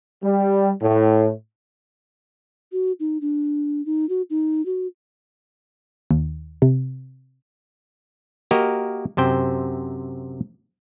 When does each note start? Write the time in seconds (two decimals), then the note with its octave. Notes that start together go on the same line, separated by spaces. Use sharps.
0.24 G3
0.80 A2
2.72 F#4
3.00 D#4
3.21 D4
3.86 D#4
4.09 F#4
4.30 D#4
4.66 F#4
6.11 D#2
6.62 C3
8.51 A#3 F#4 G4 A#4 D#5
9.17 F#2 C3 C5 G5